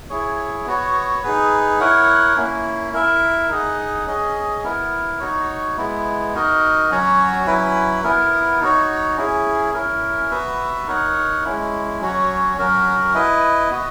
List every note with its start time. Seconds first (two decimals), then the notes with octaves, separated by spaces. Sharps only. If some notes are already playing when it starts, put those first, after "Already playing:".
0.10 E4 G#4 C#5
0.66 B3 F#4 C#5
1.23 D#4 G#4 B4
1.80 E4 A#4 C#5 F#5
2.37 A#3 C#4 E4
2.93 E4 A#4 E5
3.49 D#4 G#4 D#5 F#5
4.06 C#4 G#4 D#5
4.64 B3 E4 A#4
5.20 D#4 F#4 C#5
5.77 G#3 B3 E4
6.33 D#4 F#4 A#4 D#5
6.90 F#3 C#4 F#4 C#5
7.47 F#3 C#4 E4 B4
8.04 B3 E4 A#4
8.61 D#4 F#4 C#5
9.17 C#4 E4 G#4
9.74 C#4 E4 A#4
10.30 B3 F#4 B4 E5
10.87 D#4 A#4 C#5 F#5
11.44 G#3 C#4 E4
12.00 F#3 C#4 F#4 C#5
12.58 F#3 C#4 F#4 A#4
13.14 E4 B4 D#5
13.70 B3 F#4 B4 D#5